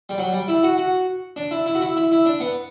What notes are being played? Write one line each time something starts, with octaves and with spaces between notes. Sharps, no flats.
G3
F#3
G3
E4
F#4
F#4
D4
E4
E4
F#4
E4
E4
E4
D4
B3